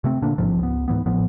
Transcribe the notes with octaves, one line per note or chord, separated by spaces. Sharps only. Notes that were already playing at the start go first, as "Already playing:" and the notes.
C3 A3 C4
A#2 D3 A#3 D4
A1 G#2 C3 F3
C#2 B3
G#2 E3 B3
A1 A2 F3 B3